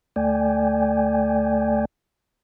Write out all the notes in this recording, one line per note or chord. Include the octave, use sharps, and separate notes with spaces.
D2 A3 D5 G5 G#5